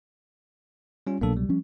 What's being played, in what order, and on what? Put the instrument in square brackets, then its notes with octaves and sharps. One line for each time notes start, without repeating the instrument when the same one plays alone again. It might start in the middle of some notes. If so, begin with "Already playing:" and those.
[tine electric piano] G3 C#4 F4
[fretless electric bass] C2 B2 F#3 [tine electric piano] A#3 D4 A4
[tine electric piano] G3
[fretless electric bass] F3 C#4